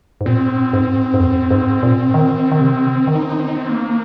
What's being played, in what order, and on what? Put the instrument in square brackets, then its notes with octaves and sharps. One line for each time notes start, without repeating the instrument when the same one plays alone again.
[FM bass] G#2
[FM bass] A#2 [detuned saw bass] C4
[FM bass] G#2
G#2
F2
G#2
A#2
D#3
D#3
C3
D#3
[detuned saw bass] D#4
C4
D#4
C4
D#4
C4
A#3